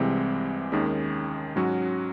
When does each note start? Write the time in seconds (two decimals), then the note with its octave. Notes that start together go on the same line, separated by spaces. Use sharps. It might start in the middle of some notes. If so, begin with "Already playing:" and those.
Already playing: C2 C3 E3 G#3 C4
0.72 D#2 D#3 G#3 C#4
1.56 G#2 F#3 C#4 F#4